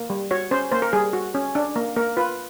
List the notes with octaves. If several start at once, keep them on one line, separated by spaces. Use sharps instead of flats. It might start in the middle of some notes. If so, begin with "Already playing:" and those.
Already playing: A#3
G3
F#4 C#5
C#4 C5
A#3 C5
A#4
G3 G#4
F#4
C#4
D4
A#3
A#3 A#4
F4 B4